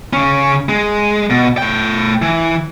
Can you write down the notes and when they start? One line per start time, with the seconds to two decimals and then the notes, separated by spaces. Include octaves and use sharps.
0.13 C#3 C#4
0.69 G#3
1.30 B2
1.58 A3 G5
2.22 E3